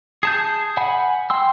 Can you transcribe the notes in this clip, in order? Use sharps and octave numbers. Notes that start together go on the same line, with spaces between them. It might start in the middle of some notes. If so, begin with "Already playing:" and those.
G#4 A5 G6
F#5 G#5 B5
G5 C6 E6